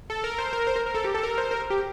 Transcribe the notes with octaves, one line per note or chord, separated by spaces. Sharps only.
A4
A#4
C5
A#4
C5
A#4
A#4
A4
G4
A4
A#4
C5
A#4
G4